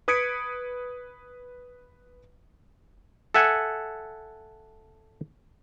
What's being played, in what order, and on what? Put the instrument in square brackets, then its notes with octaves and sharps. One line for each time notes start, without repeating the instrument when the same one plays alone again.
[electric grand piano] B4 D#6 G#6 B6 C#7 D7
[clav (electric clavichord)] A4 E5 F#5 G#5